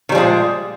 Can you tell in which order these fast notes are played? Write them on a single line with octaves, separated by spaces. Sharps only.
D#3 G3 F3 G#3 A#2